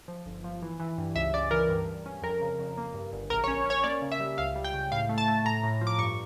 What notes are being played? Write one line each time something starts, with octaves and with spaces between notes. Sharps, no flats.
F3
G1
F3
E3
E3
G2
C#2 E5
C#3 D5
E3 A#4
G2
G2
C#4
F2 A#4
C#3
F2
A#3
G2
G1
A#1 A#4
C#5
C#4
C#4 C#5
A#3 D5
C#3
E5
G3
C#2 F5
G3
G5
C#3
A2 F5
A3
A5
A3
A2 A#5
A2
F3
D6
G2 C#6